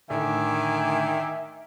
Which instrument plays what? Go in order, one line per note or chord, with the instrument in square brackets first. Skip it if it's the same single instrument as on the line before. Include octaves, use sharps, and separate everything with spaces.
[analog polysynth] A2 D3 [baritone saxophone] D#3 [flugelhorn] E5 [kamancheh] G#5 D6